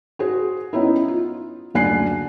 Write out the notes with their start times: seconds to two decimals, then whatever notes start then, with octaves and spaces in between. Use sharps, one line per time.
0.19 F#4 G#4 C5
0.73 B3 C#4 D#4 E4
1.08 F4
1.74 F#1 D2 D4 G#5 F#6 C7